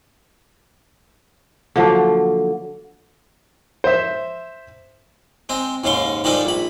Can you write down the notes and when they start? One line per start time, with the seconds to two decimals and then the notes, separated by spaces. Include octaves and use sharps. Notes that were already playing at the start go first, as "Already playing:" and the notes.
1.76 D3 F3 F#3 A#3
3.84 C5 E5
5.49 G#3 C4
5.84 D#2 G#2 C#3 F5 C6
6.24 D#3 F3 G3 G#3 D4 A4
6.45 A#1 B5